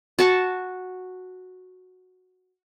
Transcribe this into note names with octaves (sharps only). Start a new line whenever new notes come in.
F#4 A5 C#6